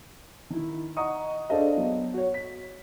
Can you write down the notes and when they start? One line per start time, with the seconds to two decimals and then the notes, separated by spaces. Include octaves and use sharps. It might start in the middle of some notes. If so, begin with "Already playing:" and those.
0.50 D#3 E4
0.97 D#5 F#5 A#5 C#6 D#6
1.49 D4 G#4 A4 C5 D#5 F5
1.76 F#3 B3
2.14 F#4 C#5
2.34 B6